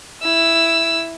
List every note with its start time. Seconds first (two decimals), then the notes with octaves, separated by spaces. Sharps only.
0.22 E4 E6